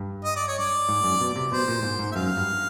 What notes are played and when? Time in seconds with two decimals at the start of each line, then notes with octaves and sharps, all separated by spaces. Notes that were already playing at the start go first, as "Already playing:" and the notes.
Already playing: G2
0.24 D#5
0.36 D5
0.48 C#5
0.59 D5
0.89 G#2
1.04 F#2
1.21 B2
1.36 C3
1.52 B2 C5
1.68 A#2
1.83 G#2
1.99 G#2
2.12 E5
2.15 F#2 F5
2.37 G2